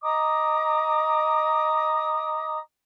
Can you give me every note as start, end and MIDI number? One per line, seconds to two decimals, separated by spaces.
0.02 2.57 75
0.02 2.57 82
0.02 2.57 86
0.02 2.57 87